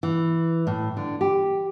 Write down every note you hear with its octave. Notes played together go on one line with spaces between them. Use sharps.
E3
A2
D3
G4